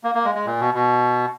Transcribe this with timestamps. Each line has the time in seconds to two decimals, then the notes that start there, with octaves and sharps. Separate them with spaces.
0.04 A#3
0.15 A#3
0.25 G#3
0.35 G#3
0.46 A#2
0.60 B2
0.74 B2